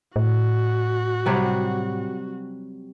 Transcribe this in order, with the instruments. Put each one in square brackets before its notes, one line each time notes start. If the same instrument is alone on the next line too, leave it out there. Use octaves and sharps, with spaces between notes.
[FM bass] A2 [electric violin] F#4
[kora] C3 F#3 G3